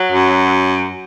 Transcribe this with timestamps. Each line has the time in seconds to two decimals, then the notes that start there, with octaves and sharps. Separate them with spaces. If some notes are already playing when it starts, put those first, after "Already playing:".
Already playing: F#3
0.12 F#2